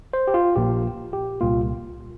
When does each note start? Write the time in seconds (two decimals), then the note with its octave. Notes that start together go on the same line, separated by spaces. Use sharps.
0.13 C5
0.28 G4
0.34 F4
0.56 A#1 A#2 A#3 G4
1.13 G4
1.41 C2 A#2 A#3 F4